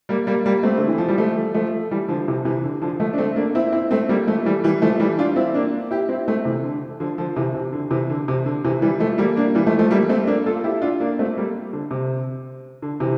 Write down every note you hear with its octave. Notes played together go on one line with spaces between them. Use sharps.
G3 A#3
G3 A#3
G3 A#3
A3 C4
D3
E3
F3
G3
F3 A3
F3 A3
E3 G3
D3 F3
C3 E3
C3 E3
D3
D3 F3
F3 A3
D4
A3 C4
A#3 D4
C4 E4
C4 E4
A3 C4
G3 A#3
F3 A3
E3 G3
E3 G3
F3 A3
E3 G3
D4 F4
C4 E4
A#3 D4
E4 G4
C4 E4
A3 C4
C3 E3
D3
D3 F3
D3 F3
C3 E3
C3
D3
C3 E3
D3
C3
D3
C3 E3
E3 G3
F3 A3
G3 A#3
A#3 D4
E3 G3
F3 A3
F3 A3
G3 A#3
A3 C4
A#3 D4
F4 A4
E4 G4
D4 F4
A#3 D4
A3 C4
G3 A#3
D3
C3
D3
C3 E3